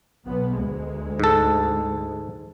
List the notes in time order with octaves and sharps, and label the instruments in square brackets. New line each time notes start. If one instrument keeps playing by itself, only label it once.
[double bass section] B1 B3
D2 G#3
[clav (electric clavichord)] G#2 A4